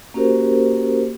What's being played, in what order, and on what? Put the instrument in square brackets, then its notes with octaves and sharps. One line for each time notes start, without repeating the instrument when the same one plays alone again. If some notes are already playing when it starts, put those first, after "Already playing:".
[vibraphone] A#3 C#4 F#4 G4 A#4 C5